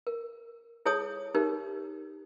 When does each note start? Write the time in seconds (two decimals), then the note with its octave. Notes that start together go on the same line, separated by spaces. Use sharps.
0.07 A#4
0.86 E4 G#4 A4 C#5 A5 D#6
1.35 D#4 G4 A#4